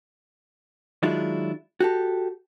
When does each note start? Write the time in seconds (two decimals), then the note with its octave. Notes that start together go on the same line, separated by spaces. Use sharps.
1.03 D#3 F#3 G#3 D4 E4 F4
1.80 F#4 G4 A4